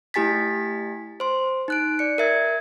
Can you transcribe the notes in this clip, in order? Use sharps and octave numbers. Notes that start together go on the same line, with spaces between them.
A3 E4 G4 G#5 A6 B6
C5 C6
D#4 F#6 D7
D5 C#7
A#4 E5 G#6